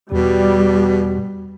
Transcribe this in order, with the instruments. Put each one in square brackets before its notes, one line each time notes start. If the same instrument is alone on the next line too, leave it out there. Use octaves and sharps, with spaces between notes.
[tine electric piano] E2 [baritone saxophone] B2 [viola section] G3